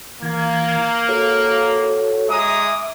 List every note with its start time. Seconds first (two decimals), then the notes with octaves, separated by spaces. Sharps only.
0.23 E3 A#3 G#6
1.08 F#4 A4 C#5
2.29 G#3 E5 A#5 D6 D#6